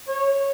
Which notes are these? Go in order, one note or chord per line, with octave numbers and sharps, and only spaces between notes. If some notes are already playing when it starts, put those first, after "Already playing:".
C#5